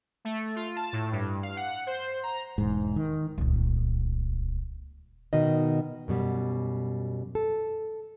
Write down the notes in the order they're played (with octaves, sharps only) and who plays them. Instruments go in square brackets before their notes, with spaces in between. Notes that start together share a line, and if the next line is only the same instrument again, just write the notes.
[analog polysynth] A3
F4
A5
A2
G2
F5
F#5
C5
A#5
[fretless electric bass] E1 G#2
D#3
[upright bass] D#1 C#2
[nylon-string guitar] B2 D#3 F#4 D#5
F#2 B2 G3
A4